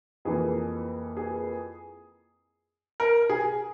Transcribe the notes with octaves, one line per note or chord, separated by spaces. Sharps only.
F2 E3 A#3 G#4
G#4
A#4
G#4